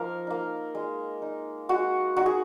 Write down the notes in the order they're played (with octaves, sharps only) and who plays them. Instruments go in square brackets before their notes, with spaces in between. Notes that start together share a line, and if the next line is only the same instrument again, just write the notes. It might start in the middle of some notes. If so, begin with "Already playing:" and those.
Already playing: [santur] F3 A#3 D#4 A#4 F5
A#3 D#4
G#3
D#4
G#3 F#4
D#4 F#4
G#4